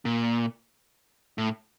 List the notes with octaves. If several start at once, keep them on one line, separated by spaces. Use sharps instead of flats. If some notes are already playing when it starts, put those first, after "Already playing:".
A#2
A2